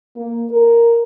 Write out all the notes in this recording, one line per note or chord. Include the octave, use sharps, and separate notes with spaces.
A#3
A#4